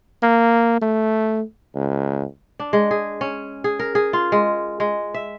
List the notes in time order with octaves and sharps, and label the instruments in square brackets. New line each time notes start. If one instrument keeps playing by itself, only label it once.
[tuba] A#3
A3
C#2
[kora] D4
G#3
G#4
C#4
G#4
A#4
G#4
F4
G#3
G#3
E5